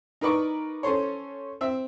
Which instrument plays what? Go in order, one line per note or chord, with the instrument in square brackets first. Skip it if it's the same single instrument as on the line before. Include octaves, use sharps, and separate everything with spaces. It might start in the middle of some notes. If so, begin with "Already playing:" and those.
[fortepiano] D#4 A#4 B4 D5 C#6
C#4 A4 C5 C#5
C4 E5